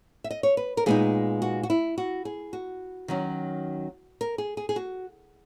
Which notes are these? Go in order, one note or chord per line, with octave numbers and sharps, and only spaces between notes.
E5
D#5
C#5
B4
A#4
A#2 G#3 B3 D#4 G#4
F#4
F#4
E4
F#4
G#4
F#4
D#3 F#3 C#4
A#4
G#4
G#4
G#4
F#4